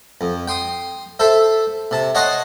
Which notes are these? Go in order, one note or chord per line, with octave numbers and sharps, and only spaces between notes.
F2
G5 C6 D#6
A4 C5 E5
C3 A5
C#5 D#5 F#5 A5 C6 C#6